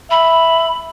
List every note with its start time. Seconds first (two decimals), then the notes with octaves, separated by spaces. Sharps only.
0.11 E5 B5